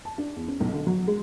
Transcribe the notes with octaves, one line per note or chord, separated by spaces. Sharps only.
A5
D4
E2
C#4
B1
D3
F#3
G#3